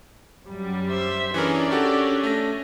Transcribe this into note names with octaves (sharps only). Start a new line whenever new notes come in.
F#2 G3
C5 E5
E3 C#4 D4 G#4 A#4 D5
F#4 G4 A4
A3 A#6